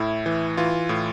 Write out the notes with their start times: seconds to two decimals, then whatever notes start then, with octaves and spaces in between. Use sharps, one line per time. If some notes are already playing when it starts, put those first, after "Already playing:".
Already playing: A2 E4
0.26 E3
0.57 E3 F4
0.89 A2